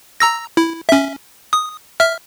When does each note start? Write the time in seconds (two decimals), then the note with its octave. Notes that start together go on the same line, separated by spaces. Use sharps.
0.20 A#5 E6 A#6
0.57 E4
0.89 C#4 E5
1.53 D#6
2.00 E5 F6